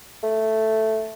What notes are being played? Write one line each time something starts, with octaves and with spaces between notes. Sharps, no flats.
A3